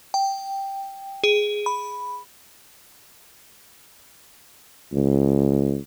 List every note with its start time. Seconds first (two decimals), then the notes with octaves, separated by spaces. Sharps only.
0.14 G5
1.24 G#4
1.66 B5
4.93 C#2